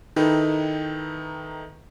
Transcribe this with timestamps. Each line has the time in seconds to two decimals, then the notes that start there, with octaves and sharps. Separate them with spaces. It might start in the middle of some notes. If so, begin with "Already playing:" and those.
0.16 D#3 D#4 E4 A4 B4 G5